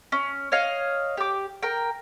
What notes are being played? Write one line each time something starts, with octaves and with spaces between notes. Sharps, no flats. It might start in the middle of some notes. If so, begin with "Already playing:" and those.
C#4
C#5 D#5 F5
G4 D6
A#4 G5